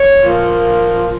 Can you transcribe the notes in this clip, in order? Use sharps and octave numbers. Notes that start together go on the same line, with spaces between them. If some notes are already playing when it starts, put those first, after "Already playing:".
Already playing: C#5
A#2 F3 A#3